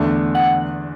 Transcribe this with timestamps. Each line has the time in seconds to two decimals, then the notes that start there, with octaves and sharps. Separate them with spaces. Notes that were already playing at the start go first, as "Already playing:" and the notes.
Already playing: E2 D3 A3 D4
0.35 F#5